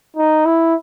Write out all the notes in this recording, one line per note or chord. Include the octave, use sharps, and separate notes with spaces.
D#4
E4